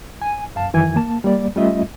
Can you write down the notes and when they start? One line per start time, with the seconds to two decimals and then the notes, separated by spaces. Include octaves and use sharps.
0.22 G#5
0.55 F#2 F5 A5
0.73 F#2 D#3 E3 G#5 G#6
0.96 A#3 A5
1.24 G3 A#3 D5
1.56 G3 A3 C#4 F4 D#5 E5